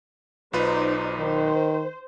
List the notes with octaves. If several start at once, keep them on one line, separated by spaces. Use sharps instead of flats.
B1 D#4 F4 B4 C5 D5
D#3 C5